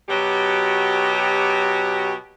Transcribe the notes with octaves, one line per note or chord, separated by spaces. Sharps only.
B2 F#3 F#4 G4